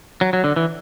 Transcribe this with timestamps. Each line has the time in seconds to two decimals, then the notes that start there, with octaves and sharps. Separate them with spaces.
0.21 F#3
0.33 F#3
0.44 D3
0.56 E3